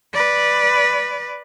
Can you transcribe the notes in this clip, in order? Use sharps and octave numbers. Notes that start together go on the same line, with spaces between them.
B4 D5